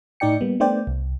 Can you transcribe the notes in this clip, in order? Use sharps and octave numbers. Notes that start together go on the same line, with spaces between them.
A2 D#4 D5 G5 C#7
G3 A#3 B3
A3 B3 D4 C5 D5 G5
C2